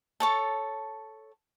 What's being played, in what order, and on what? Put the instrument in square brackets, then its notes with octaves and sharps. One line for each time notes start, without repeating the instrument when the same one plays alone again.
[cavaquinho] A4 C#5 A5